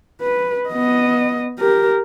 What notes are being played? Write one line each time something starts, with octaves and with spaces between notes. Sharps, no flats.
B4
B3 D#5
G4 A#4